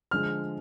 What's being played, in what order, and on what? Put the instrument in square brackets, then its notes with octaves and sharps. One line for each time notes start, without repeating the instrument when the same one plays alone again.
[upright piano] D3 F3 G#3 F6